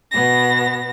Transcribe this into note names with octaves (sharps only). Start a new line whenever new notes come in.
B2 B3 A#6